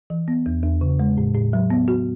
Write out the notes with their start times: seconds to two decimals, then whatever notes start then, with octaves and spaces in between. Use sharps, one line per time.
0.10 E3
0.28 B3
0.46 E2
0.64 E2
0.81 C#3
1.00 G#3
1.17 A2
1.35 A2
1.53 F#3
1.70 B3
1.88 F#4